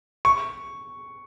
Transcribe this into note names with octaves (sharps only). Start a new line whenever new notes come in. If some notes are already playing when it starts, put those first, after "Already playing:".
C#6